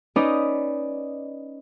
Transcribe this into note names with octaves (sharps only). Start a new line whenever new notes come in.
C#4 D#4 B4 D5 D#5